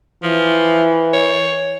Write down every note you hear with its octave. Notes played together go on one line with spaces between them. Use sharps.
E3 F3
C#5